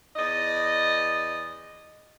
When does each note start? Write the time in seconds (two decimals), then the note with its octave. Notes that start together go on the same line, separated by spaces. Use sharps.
0.16 E2 D5 D#5